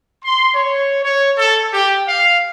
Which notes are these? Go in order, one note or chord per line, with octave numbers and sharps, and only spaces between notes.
C6
C#5
C#5
A4
G4
F5